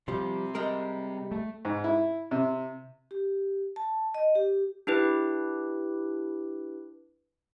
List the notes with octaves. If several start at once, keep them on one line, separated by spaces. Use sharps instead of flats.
C3 F3 G3
G3 G#3 A#4
A3
G#2
E4
C3
G4
A5
D#5
G4
D4 E4 G4 B4